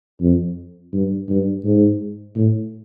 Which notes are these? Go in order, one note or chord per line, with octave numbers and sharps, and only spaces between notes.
F2
G2
G2
G#2
A2